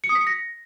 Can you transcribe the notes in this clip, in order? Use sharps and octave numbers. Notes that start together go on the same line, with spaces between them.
C#7
D#6
B6
C#7
A#6